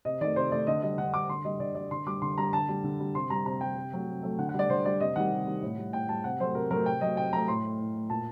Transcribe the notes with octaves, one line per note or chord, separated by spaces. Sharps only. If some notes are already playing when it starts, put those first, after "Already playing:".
C3 D#5
D#3 A3 D5
C3 C5
D#3 A3 D5
D3 D#5
G3 D#5
D3 F#5
G3 D6
D3 C6
G3 D#5
D3 D5
G3 D5
D3 C6
G3 D6
D3 C6
G3 A#5
D3 A5
G3
D3
G3
C3 C6
G3 A#5
C3 A#5
G3 G5
C3
F#3 A3
C3
F#3 A3
D3 F#5
F#5
G3
D5
D3 C5
G3 D5
C3 D#5
D#3 G3 F#5
C3
D#3 G3
A2
G3
A2 G5
G3 A5
C3 F#5
F#3 A3 C5
C3 A#4
F#3 A3 A#4
C3 G5
F#3 A3 D#5
C3 G5
F#3 A3 A#5
A2 C6
A3
A2
A3
A#2 A5